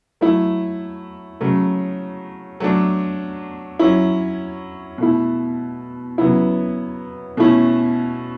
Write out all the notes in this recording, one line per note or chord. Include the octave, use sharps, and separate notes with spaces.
F#3 A3 E4
C#3 F#3 A3
F#3 A3 D4
F#3 C#4 E4
B2 A3 E4
C#3 F#3 B3 E4
B2 A3 C#4 E4